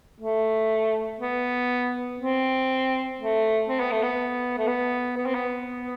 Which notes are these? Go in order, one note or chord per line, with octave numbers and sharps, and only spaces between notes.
A3
B3
C4
A3
C4
B3
A3
B3
A3
B3
B3
C4
B3